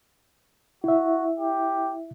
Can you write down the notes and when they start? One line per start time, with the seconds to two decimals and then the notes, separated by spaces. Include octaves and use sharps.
0.84 E4 F#4 E5
1.39 G4